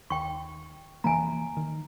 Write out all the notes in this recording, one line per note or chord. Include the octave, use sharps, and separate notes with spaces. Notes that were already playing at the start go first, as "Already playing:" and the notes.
D#2 G5 C#6
F1 E3 A#3 G#5 A#5
D#3